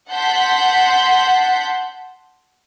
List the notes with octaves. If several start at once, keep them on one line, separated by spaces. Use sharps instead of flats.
F#5 A5 C6 G6 B6